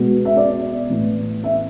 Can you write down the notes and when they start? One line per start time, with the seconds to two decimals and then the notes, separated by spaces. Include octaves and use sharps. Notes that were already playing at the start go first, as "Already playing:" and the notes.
Already playing: B2 G#3 B3
0.25 E5
0.37 D5
0.90 A2 E3 B3
1.44 E5